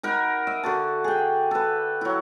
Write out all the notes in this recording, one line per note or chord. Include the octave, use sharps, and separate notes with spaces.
D#4 A#4 F#5 B5
D#5 E5
D3 F#4 A5
G#4 G5
A4 B4
F#3 E4